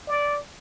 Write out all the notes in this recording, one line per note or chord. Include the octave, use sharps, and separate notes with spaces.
D5